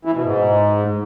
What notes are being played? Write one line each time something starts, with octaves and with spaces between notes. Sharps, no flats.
E3
B2
G#2